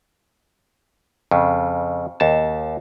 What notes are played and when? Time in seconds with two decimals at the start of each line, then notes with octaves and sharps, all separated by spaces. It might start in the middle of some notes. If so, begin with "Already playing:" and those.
1.31 F2 C#3
2.20 D#2 A5